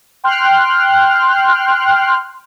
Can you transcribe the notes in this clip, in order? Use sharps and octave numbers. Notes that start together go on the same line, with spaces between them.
G5 C6 F6 F#6